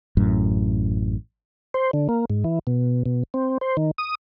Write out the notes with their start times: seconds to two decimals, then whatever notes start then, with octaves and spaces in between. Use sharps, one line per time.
0.17 A1 F#2 A2
1.74 C5
1.93 D3
2.09 A#3
2.30 G#2
2.44 E3
2.67 B2
3.06 B2
3.34 C4
3.61 C5
3.77 D#3
3.98 D#6